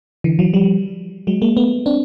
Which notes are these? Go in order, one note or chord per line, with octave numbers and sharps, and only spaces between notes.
D3 E3
E3 F#3
F3 G3
F#3 G#3
G#3 A#3
A3 B3
C4 D4